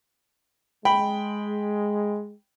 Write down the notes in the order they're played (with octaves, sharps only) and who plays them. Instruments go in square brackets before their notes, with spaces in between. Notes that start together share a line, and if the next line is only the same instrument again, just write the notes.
[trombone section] G#3 [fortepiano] G5 B5